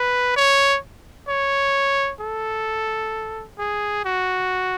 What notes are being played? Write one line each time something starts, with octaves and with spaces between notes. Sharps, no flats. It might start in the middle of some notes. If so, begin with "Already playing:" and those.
Already playing: B4
C#5
C#5
A4
G#4
F#4